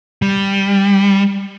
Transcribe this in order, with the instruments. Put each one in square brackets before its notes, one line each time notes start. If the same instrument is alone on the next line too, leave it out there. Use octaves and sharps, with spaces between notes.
[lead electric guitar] G3